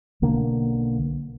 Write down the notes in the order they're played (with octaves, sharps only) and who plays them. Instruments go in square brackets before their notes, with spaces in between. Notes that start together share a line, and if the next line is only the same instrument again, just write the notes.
[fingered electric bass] B1 D3 A#3